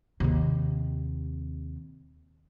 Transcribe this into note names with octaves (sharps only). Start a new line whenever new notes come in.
D#2 C3